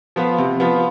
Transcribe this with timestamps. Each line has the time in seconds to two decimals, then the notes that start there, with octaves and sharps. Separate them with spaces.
0.16 F3 B3 F4
0.38 C3
0.60 F3 B3 F4